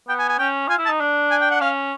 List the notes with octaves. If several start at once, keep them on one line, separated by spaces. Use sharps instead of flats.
B3 G5
G#5
G#5
C#4 G5
F4 G#5
E4
A5
D#4
D4
G#5
G5
F#5
C#4 F5